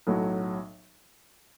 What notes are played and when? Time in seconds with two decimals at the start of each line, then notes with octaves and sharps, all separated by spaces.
0.07 B1 A2 F#3